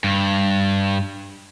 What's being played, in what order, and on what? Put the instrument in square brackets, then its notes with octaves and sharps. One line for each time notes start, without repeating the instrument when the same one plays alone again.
[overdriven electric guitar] G2